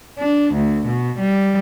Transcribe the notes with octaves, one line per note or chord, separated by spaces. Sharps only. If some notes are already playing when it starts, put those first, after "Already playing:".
D4
D2
B2
G3